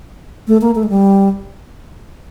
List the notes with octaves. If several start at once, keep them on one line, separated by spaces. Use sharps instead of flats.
A3
A#3
A3
G#3
G3